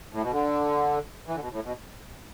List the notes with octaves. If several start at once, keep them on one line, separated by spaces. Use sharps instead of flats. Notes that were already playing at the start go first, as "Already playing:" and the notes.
A2
B2
D3
E3
D3
B2
A2
B2